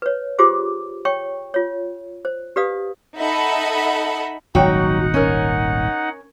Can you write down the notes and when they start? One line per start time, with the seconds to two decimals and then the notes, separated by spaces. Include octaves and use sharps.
0.02 B4 C#5
0.39 F4 G4 G#4 C5 D6
1.05 C#5 G5 C#6
1.54 F4 C#5
2.25 C5
2.56 G4 B4 D5 F5 D#6
3.18 D#4 A4 D#5 E5 F#5 B5
4.55 D#1 G#1 F#3 D#4 F#4 F#5 G5
5.14 C#4 A#4